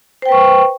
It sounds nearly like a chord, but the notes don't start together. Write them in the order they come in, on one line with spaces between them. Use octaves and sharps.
C5 G5 B4 C#6